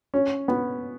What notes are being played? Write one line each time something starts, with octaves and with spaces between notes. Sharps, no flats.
C#4
B3